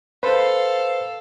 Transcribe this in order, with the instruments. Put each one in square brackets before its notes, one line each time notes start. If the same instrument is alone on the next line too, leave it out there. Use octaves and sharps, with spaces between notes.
[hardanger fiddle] A4 F5 [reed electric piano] B4 C5